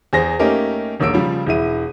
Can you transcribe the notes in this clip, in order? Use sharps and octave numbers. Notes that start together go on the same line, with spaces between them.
E2 G#4 C5 A#6
A3 A#3 C#4 D#4 G4 A#4
E1 B1 A#3 E6 D7
C#3 F3 G3
E1 E3 E4 D#7